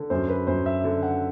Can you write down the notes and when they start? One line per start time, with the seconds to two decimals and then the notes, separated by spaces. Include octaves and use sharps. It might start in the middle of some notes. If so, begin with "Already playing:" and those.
Already playing: D3
0.10 F#2 C5
0.29 B4
0.47 F#2 C5
0.66 E5
0.84 D3
1.03 F#5